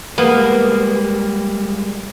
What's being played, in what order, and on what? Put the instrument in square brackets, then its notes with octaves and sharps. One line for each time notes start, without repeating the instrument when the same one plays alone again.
[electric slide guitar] G3 G#3 [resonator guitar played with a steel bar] A#3 [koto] B3